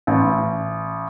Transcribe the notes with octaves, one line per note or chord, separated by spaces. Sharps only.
A1